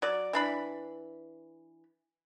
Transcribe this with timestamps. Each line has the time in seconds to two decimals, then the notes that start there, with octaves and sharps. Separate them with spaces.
0.02 F#3 D5
0.33 E3 D4 B5